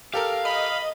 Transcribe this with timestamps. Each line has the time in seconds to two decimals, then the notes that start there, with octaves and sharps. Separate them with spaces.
0.14 G4 A4 A#4 F5
0.45 D#5 B5